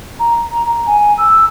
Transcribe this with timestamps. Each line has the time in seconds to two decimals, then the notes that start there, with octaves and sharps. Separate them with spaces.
0.20 A#5
0.87 G#5
1.18 E6